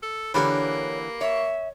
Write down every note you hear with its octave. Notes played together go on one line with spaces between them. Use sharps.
A4
D3 E3 A#3 G4 A#4 B4 C#5
C#5 E5